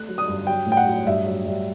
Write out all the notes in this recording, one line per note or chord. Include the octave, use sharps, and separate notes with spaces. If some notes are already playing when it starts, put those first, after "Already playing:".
Already playing: A3 F#6
F#3
D#6
G2
F#3 G5
A2
G5
F#5
F#3
G2 E5
F#3
G2